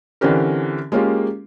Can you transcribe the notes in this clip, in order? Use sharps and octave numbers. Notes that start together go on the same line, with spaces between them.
D3 E3 C4 C#4 G4 A#4
G#3 A#3 C#4 F4 G4